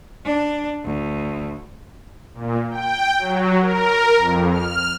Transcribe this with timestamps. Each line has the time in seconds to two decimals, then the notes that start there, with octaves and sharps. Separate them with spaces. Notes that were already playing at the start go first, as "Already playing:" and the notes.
0.25 D4
0.84 D2
2.34 A#2
2.70 G5
3.18 F#3
3.61 A#4
4.17 F2
4.50 F6